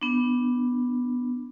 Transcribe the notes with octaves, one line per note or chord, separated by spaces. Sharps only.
B3 D4